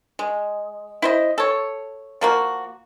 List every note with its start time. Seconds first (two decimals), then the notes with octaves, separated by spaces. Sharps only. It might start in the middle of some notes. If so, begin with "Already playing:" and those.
0.19 G#3
1.02 E4 C5 D#5
1.38 A4 C#5
2.21 F3 A#3 F#4